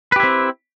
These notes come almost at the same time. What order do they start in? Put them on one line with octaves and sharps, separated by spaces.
B4 G4 E4 C4